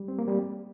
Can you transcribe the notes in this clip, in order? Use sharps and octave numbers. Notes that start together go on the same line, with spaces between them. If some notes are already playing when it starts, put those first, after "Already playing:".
Already playing: G3
C4
A#3
G3